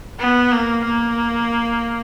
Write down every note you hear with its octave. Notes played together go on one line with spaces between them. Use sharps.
B3
A#3
A#3